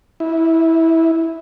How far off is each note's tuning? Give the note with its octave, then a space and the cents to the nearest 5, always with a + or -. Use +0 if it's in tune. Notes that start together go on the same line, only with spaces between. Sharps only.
E4 -15